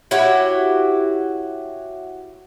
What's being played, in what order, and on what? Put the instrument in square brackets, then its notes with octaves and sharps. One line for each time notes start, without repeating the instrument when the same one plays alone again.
[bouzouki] E4 F#4 G4 C#5